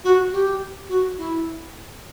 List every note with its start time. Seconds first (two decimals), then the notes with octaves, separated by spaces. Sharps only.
0.04 F#4
0.33 G4
0.89 F#4
1.18 E4